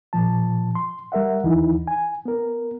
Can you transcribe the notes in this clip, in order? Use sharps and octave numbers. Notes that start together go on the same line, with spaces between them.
A#2 F3 A5
C6
G3 A#4 E5 F#5
D#2 E3 D#4 E4
G#5
B3 A#4